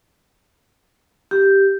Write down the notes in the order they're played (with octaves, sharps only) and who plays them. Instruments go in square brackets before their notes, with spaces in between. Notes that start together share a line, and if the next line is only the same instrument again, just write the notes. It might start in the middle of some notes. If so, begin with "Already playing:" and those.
[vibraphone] G4